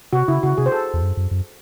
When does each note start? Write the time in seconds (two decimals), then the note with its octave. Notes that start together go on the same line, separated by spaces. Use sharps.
0.13 C3 F#4
0.28 C#3 E4
0.43 C#3 F#4
0.58 C3 G#4
0.66 C5
0.72 A4
0.94 E2
1.02 F#2
1.17 F#2
1.31 F#2